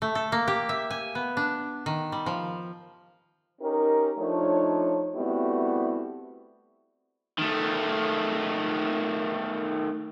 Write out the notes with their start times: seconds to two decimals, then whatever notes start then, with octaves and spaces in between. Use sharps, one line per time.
0.02 A3
0.15 A4
0.32 A#3
0.48 G4
0.69 E5
0.91 G#5
1.15 B3
1.37 D4
1.86 D#3
2.12 G3
2.26 F3
3.61 C#4 D#4 G4 A#4
4.17 F3 A3 D4 D#4 C#5
5.15 G3 A3 B3 C4 E4 F#4
7.38 D#3 A3